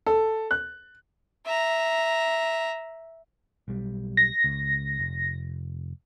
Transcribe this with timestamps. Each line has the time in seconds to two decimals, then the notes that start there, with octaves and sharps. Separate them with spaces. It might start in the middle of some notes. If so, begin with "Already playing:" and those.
0.07 A4
0.51 F#6
1.45 E5 A#5
3.68 B1 G3
4.17 A#6
4.44 C#2
4.99 F1